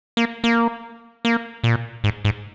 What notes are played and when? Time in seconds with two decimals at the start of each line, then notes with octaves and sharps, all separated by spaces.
0.17 A#3
0.44 A#3
1.25 A#3
1.64 A#2
2.04 G#2
2.25 G#2